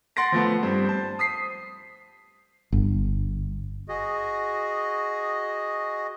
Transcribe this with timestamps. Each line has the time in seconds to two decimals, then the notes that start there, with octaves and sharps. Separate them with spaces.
0.16 F#5 C6 A6 A#6 D7
0.32 F3 A3 B3
0.63 G2 C4
0.85 C5 A5
1.19 D#6 B6 C7
2.72 G1
3.88 F#4 G#4 D#5